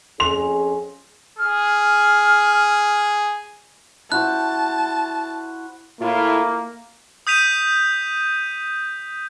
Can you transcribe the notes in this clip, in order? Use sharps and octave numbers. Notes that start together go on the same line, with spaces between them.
F2 C#4 G#4 C6 F7
G#4 F6
E4 F#4 C5 A5 F#6
A2 A#3 E4 F4
D#6 G6 B6 D#7 F7